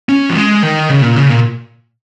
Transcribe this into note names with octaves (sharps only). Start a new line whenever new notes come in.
C#4
F3
G#3
D#3
C#3
A#2
C#3
A#2